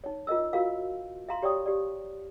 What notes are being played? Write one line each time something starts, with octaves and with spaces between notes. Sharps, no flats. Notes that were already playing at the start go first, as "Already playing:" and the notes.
D#4 C#5
F4 A#4 D#5 E6
F4 F#4 A#4 F5
E5 F5 A#5 C6
G4 C#5 D5 G5 D#6
G4 D5